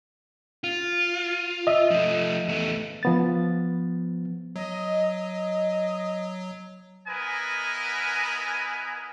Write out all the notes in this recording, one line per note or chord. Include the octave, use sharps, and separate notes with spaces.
F4
D#5 E5
F3 A3
E2 A3
F3 B3 A6
F#3 D#5
B3 E4 A#4 B4 D#5 G#5